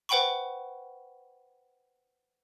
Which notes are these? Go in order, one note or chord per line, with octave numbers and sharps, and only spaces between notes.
B4 C5 F#5 G5 B5 C#6